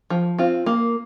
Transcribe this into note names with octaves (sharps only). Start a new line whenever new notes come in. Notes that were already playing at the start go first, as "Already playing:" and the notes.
F3
C4 F4
A#3